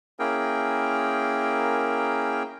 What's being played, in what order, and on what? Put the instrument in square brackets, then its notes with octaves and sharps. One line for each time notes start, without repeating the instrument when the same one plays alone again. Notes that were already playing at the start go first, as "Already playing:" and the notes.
[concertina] A#3 C#4 E4 G#4 A#4 G5